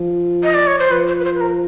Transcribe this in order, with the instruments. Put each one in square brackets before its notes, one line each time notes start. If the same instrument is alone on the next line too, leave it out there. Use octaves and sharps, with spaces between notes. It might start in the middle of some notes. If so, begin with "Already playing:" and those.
Already playing: [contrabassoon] F3
[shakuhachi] D#5
D5
C#5
C5
[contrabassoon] F3 [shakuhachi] B4
[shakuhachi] C5
B4
C5
B4
A#4